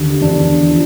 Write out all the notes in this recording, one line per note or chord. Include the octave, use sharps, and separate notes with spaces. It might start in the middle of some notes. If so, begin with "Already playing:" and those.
Already playing: D#2 D3
E2 D4
F3